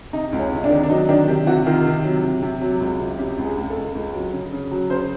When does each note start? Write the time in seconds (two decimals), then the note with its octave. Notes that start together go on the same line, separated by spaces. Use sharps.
0.13 C3 D#4
0.33 C#2
0.39 C#4
0.52 C3
0.64 D4
0.71 D#3
0.84 D4
0.90 F#3 D#4
1.09 D#3 D4
1.28 C3 G4
1.47 C3 F#4
1.66 D#3 F4
1.86 C3
2.04 F#3
2.23 C3
2.42 C3
2.62 F#3
2.81 C#2
3.00 C3
3.19 C#3 G4
3.38 C#2
3.44 G#4
3.57 C#2
3.70 A4
3.76 C#2
3.95 C#2
4.14 F#3
4.33 C#3
4.53 C#3
4.71 F#3
4.90 C#3 C5